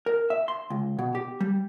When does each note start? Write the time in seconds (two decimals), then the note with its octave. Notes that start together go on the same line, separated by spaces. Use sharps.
0.06 A#4
0.30 E5
0.48 C6
0.70 C#2
0.99 B2
1.15 G4
1.40 G3